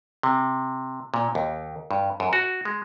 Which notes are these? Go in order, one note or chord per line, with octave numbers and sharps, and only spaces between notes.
C3
A#2
D#2
G2
F#2
F#4
G#3